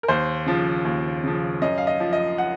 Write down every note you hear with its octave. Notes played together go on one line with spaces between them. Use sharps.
A#4
D#2 C5
C#3 F3
D#2
C#3 F3
F#2 D#5
F5
D#5
F3
D#5
F#5